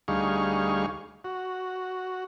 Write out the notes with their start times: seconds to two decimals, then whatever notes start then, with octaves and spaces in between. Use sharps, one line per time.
0.08 D2 G3 D#4 G#4 F5 C#6
1.24 F#4